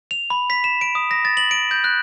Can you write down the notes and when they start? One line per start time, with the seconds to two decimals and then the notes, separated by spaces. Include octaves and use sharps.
0.11 F7
0.30 B5
0.50 B6
0.64 E7
0.81 D7
0.95 D#6
1.11 A#6
1.25 A6
1.37 F#7
1.51 D7
1.71 G6
1.84 F#6